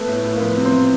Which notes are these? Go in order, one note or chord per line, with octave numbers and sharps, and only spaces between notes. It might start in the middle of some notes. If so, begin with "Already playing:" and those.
Already playing: A3 B3
A2
A2
A#3
F3 B3
C3
C4
C3